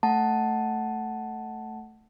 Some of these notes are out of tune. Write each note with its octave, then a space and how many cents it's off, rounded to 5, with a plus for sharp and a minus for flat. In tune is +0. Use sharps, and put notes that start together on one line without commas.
A3 +0 F#5 +5 A5 +0